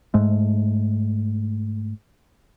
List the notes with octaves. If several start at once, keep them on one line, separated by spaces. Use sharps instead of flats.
G#2 G#3 A3